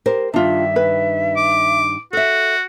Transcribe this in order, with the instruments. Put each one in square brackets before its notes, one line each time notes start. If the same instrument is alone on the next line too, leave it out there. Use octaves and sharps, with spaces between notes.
[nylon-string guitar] G4 A#4 C5
[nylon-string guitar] G2 D#3 [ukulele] D4 F4 [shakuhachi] E5
[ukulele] B4
[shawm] D6
[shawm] F#4 [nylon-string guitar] A4 E5